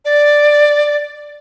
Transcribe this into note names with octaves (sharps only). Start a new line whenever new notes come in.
D5